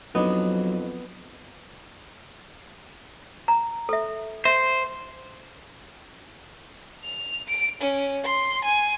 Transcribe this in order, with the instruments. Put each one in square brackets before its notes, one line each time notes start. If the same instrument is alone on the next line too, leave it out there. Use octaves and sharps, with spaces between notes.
[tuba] F2 [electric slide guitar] F#3 [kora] B3 [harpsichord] D4 D#4
[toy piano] A#5
A4 E5
[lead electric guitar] C5 [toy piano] E5
[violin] F7
D7
C#4
C6
G#5